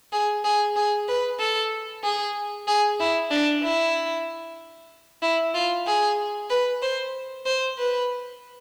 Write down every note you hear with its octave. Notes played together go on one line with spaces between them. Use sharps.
G#4
G#4
G#4
B4
A4
G#4
G#4
E4
D4
E4
E4
F4
G#4
B4
C5
C5
B4